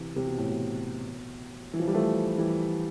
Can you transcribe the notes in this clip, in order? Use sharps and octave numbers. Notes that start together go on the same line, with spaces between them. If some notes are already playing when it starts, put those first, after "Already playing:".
Already playing: C3 E3
C3
B2
A2
B2
E3
F3
G3
F3 A3
E3 G3